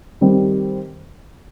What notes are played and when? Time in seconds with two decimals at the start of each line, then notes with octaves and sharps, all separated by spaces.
0.21 D#3 G3 C4